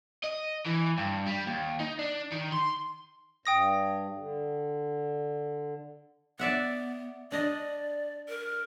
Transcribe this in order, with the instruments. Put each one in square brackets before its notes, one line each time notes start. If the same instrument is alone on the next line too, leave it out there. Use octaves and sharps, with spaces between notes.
[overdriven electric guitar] D#5
E3
G2
G3
D#2
D#4
D4
D#3
C6
[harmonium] G2 [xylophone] G5 D#6 A#6
[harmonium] D3
[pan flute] B3 [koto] D5 E5 F#5
[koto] D4 D#5 [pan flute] D5
[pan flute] A#4